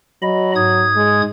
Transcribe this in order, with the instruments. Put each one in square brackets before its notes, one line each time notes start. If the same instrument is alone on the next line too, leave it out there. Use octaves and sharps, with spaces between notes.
[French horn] F#3 [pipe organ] D#5 B5
[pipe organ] G#2 D#6 G#6
[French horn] G#3